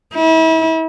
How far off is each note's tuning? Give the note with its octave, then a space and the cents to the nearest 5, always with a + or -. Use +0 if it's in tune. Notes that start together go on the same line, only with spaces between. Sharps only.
E4 -35